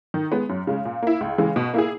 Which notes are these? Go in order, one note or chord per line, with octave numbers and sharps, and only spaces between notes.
D#3
G#3 B3
F#2
C#3 G#3
A#2
A#3 E4
C#2
C#3 E3 G#3
B2
A#3 E4 G#4